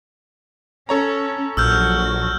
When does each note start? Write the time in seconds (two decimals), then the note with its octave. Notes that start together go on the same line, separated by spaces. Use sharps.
0.89 C#4 A4 C#5 A#5
1.57 A#1 F#3 F#4 E6 F6 G6